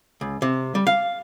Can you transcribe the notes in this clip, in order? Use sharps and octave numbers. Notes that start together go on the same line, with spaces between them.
C#2
C3
G3
F5